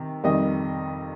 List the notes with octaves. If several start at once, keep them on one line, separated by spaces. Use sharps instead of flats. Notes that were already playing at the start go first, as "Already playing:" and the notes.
Already playing: C3 D#3
F2 C3 D#3 G3 D#5